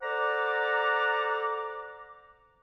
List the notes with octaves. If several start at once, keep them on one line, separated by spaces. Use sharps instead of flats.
A4 C5 D5 F#5 A#5 D6